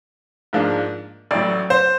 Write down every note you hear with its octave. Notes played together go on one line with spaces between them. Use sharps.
G#2 F3 A#3 D4
A1 A2 F#3 D5
C5